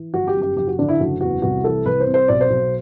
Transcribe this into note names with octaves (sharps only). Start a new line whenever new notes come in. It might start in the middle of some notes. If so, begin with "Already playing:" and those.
Already playing: E3
G1 F#4
G4
F#2
G4
F#1 G4
F#4
D3 D4
E4
F#1 F#4
E2 F#4
C2 F#4
E3 A4
C2 B4
C5
C3
C5
B1 D5
C5
B1